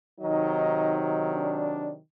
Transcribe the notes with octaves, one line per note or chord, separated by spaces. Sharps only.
C3 D#3 F#3 D#4 D#5
D4 D5